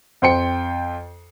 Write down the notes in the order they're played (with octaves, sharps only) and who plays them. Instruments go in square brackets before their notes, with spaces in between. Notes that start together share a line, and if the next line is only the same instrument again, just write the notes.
[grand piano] F2 C5 G5 C#7